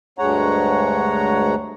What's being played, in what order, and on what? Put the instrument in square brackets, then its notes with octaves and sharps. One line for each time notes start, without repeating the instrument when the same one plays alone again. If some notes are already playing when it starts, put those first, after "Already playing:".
[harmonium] D2 G2 G#3 C#5 F#5 A#5